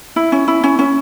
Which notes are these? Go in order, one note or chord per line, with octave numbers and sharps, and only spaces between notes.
E4
C#4
E4
C#4
C#4